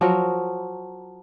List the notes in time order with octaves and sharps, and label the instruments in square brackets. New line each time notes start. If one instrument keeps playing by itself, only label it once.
[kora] F3 F#3 F#4 A#4